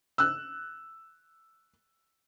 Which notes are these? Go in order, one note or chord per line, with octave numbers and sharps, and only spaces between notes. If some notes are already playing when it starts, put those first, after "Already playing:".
E6 F#6